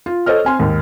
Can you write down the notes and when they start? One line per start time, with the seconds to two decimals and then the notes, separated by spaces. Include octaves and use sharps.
0.06 F4
0.26 A4 C5 C#5 D#5 F6
0.45 C4 G#5 C6
0.60 D#2 G#2